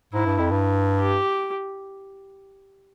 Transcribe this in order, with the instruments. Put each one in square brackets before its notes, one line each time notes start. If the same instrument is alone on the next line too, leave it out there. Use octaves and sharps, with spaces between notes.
[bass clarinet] G#2 [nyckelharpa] E4
[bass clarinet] G2
F2
G2
[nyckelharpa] G4